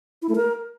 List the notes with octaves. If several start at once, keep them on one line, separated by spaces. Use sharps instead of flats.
E4
A3
A#4